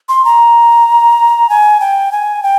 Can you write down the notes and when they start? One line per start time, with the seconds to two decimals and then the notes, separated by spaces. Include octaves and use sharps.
0.09 C6
0.25 A#5
1.50 G#5
1.80 G5
2.12 G#5
2.43 G5